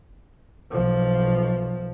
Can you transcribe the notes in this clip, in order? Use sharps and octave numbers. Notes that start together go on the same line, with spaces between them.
B1 F3